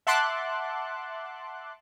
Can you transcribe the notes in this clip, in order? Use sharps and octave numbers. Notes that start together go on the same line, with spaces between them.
E5 F#5 A5 C6 D6 F#6